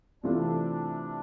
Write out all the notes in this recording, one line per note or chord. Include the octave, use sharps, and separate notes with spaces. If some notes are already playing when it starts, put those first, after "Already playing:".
C3 E3 A3 C4 D4 F4